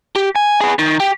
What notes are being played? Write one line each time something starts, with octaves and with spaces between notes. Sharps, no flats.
G4
G#5
B3 G#4
D#3
G4